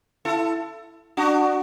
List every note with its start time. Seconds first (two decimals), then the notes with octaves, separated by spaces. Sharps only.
0.25 E4 A4
1.17 D4 F#4